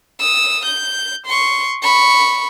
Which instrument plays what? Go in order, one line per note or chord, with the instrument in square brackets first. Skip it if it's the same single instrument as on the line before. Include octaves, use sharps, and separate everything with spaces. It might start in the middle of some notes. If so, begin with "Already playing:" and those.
[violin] D#6 E6
G6
C6 C#6
B5 C#6